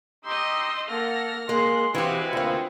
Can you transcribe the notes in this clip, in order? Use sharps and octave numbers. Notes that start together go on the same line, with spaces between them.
D#4 G4 D#5 C6 E6
A#3 A4 F#5 F6 A#6
G#3 A#3 C6 F#6
E3 G#3 C4 E4 F#4 G4 B4 F5
D2 A#3 C4 F4